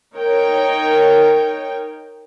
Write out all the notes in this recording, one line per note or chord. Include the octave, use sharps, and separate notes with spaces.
D#4 A#4 C#5 G5